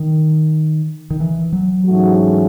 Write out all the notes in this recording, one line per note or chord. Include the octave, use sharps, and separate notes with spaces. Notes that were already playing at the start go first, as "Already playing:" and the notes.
Already playing: D#3
D#3
E3
F#3
G#2 E3 A3 C#4 F#4